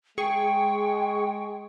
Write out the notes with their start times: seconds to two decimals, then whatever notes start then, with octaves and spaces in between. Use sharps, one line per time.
0.18 G#3 G#4 G5 C#6